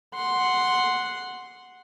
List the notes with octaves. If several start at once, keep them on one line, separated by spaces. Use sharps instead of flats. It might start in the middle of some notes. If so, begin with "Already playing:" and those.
F#5 C6